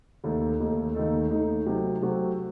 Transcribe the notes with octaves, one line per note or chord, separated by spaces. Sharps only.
D#2 D#3 A3 D#4 A4
D#2 D#3 A3 D#4 A4
D#2 D#3 A3 D#4 A4
D#2 D#3 A3 D#4 A4
C3 F#3 A3 C4 F#4
C3 F#3 A3 C4 F#4